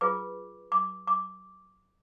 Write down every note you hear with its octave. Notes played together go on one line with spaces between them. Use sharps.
F4 G#4 B4 D6
D6
D6